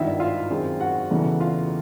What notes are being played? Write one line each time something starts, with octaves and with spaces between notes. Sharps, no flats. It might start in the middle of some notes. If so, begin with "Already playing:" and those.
Already playing: G#1 G2 D#3 E4 E5
F4 F5
F#2 D#3 G#3 C4
F#4 F#5
E1 E2 C#3 E3 A3
F4 F5